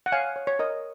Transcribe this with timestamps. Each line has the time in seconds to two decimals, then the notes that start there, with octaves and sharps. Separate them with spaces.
0.06 F#5
0.12 C#5 F5 G#5
0.36 C#5
0.47 C#5
0.59 A#4 D#5